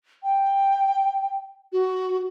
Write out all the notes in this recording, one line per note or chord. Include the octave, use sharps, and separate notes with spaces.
G5
F#4